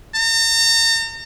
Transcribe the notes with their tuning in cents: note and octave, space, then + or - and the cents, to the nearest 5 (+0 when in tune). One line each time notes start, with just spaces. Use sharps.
A#5 -40